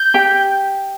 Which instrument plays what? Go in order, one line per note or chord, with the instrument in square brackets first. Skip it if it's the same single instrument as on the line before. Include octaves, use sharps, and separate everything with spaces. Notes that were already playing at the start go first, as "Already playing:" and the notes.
Already playing: [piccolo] G6
[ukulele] G4 G5